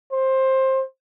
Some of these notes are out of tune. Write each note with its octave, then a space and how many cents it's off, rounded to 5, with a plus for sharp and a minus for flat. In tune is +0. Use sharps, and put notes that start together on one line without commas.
C5 +15